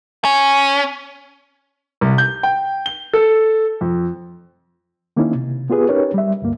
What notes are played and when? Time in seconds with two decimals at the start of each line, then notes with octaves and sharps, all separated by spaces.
0.25 C#4
2.01 C2
2.18 G6
2.43 G5
2.86 G7
3.14 A4
3.81 F2
5.17 D#3 A#3 C4 C#4 D#4 E4
5.35 C3
5.70 B3 F4 G4 G#4 B4
5.89 C#4 D#4 G4 A#4 B4 C#5
6.14 G3 E5
6.42 D2 G2 A#3